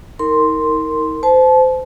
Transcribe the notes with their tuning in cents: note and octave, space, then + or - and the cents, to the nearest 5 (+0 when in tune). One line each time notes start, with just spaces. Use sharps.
D#4 +40 A#4 -20 C6 +0
C5 -25 A5 -30